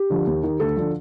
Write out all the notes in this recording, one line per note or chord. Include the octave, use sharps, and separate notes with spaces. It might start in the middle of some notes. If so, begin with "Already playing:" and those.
Already playing: G4
D3 F3
D#2
D#3
D2 A4
D3 F3